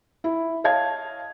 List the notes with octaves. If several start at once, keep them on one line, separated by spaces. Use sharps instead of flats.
E4
C#5 D#5 F5 A5 G#6